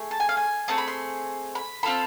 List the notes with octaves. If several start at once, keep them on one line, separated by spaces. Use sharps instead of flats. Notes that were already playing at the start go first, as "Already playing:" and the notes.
Already playing: A3 G#4
A5
G#5
F5
G#5
A3 C4 G#4 A5
B5
C6
B5
C4 F4 A4 B5